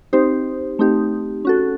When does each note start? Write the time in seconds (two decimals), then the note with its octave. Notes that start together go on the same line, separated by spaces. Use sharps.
0.13 C4 D#4 G4 C5
0.79 A3 C4 D#4 G4
1.45 C#4 F#4 A4